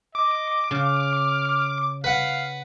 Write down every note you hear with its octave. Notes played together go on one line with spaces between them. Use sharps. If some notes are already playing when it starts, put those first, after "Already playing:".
D#5 D6
C#3 F6
B4 F5 F#5